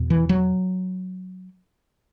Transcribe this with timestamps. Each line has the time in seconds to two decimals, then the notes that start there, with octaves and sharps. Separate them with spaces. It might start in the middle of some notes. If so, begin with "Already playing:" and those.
Already playing: E2 B2
0.10 E3
0.29 F#3